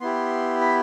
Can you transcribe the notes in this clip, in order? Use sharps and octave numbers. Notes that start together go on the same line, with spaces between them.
B3 E4 G4 C6
B5